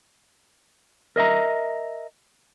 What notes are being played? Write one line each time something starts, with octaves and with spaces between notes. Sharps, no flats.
A#4 D#5 E5 A#5